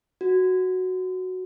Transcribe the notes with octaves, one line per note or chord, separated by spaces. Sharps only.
F#4